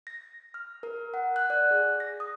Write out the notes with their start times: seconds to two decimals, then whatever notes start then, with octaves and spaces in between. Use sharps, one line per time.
0.07 A#6
0.54 F6
0.83 A#4
1.14 F#5
1.36 F#6
1.50 D5
1.71 G#4
2.00 A#6
2.20 D#6